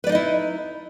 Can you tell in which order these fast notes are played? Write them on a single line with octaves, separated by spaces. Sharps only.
B4 D5 D#4 D#5 E4